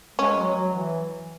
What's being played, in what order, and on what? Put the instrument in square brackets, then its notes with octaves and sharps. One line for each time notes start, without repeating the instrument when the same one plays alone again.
[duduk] G#3 [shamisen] C#4
[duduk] F#3
F#3
E3